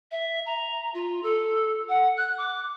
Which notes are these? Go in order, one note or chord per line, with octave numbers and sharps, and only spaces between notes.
E5
A#5
F4
A4
F#5
F#6
D6